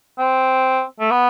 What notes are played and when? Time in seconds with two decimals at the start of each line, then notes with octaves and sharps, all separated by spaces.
0.19 C4
1.00 A3
1.11 B3